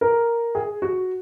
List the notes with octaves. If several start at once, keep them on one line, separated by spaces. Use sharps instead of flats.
A#4
G#4
F#4